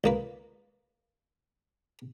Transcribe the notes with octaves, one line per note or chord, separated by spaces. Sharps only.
C#2 A#3 B4